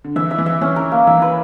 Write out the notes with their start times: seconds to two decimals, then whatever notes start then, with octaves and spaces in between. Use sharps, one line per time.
0.04 D3
0.16 E3 E5
0.31 E5
0.38 E3
0.46 E5
0.61 E3 C#4
0.76 A#4
0.92 A#3
1.07 E3 E5
1.22 B4